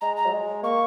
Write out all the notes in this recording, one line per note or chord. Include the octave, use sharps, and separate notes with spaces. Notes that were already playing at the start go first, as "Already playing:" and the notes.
G#3 A#5
A#5
F#3
G#3
A#3 C#6